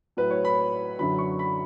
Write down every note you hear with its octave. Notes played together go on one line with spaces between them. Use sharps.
A2 F#3 B4
C#5
B5
F#2 D3 F#3 B5
C#6
B5